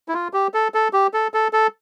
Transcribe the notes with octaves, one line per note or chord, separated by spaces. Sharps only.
E4
F4
G4
A4
A4
G4
A4
A4
A4